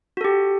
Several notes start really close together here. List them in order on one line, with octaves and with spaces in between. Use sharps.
F#4 A4 G4